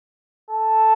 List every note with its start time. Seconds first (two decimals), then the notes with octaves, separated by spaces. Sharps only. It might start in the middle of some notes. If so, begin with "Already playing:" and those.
0.51 A4